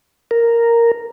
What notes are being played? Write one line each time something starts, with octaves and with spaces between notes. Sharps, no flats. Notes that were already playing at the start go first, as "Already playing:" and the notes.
A#4